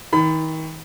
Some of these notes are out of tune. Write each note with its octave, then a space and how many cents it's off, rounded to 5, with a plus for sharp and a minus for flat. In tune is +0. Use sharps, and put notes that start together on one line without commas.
D#3 +35 B5 +35